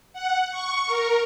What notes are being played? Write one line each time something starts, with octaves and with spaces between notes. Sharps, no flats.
F#5
C#6
A#4